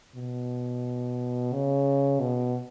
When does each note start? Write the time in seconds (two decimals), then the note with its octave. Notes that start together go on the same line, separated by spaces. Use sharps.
0.16 B2
1.53 C#3
2.20 B2